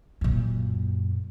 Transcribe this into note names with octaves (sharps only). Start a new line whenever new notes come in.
F#2 A#2